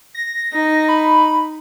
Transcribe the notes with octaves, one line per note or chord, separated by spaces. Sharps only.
A#6
D#4
B5